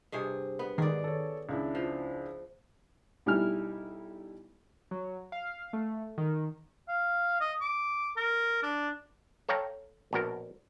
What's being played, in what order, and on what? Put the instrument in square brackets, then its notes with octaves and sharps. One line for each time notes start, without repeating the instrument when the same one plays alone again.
[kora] G2 C3 G#4
B3
[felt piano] G#2 [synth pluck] D#3 [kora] G#4 D5
[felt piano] A4 C#5
C#2 D4 E4
[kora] F3
[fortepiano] B1 G3 D#4 E4 G#5 F6
[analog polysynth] F#3
F5
A3
D#3
[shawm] F5
D#5
D6
A#4
D4
[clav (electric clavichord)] A4 C#5 F5 G5 A#5
A#1 B2 F#4 A#4